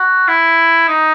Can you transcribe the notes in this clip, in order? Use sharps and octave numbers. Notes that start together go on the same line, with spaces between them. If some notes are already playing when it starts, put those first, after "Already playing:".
Already playing: F#4
E4
D#4